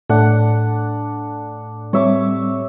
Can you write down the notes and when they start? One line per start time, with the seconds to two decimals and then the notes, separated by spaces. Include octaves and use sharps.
0.10 A2 D4 F#5
1.93 G3 C4 C#5 E5 D6